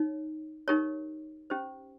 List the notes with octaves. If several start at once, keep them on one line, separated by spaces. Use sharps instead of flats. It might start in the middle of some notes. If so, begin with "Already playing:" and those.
Already playing: D#4 C#5
D#4 G4 A#4 C#5
C#4 G4 C5